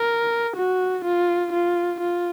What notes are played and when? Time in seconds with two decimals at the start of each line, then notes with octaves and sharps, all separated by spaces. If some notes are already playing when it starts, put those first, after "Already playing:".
Already playing: A#4
0.56 F#4
1.05 F4
1.52 F4
2.00 F4